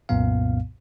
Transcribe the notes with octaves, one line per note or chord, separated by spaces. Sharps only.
C2 F#2 A#2 B3 F5